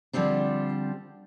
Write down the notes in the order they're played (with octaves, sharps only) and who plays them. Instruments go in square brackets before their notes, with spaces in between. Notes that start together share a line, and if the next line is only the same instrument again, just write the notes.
[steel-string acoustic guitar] D3 F3 G3 C4 D4